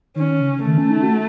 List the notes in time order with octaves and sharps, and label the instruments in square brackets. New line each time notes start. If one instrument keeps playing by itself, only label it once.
[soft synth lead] D#3 [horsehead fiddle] C#4
[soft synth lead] C#3
[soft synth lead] D#3 [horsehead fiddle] A3
[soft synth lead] C#4
D#4
F#4